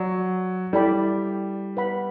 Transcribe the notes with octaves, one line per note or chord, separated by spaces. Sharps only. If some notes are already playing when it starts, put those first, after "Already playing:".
Already playing: F#3 D5
G3 E4 A4 D5 G5 B5
B4 F#5 B5